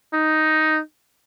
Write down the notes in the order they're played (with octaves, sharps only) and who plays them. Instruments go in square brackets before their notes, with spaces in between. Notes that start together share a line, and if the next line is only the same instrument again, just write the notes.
[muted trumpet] D#4